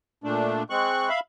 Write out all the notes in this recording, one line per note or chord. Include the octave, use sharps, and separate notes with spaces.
A#2 A3 D4
G#3 C4 C#6 F#6
E5 F5 B5